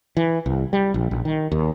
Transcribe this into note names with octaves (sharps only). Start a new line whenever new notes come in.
E3
C2
G3
A#1
A#1
D#3
D#2